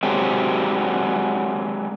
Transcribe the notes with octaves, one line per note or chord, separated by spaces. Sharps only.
F#3 G#3 C4 D4 G4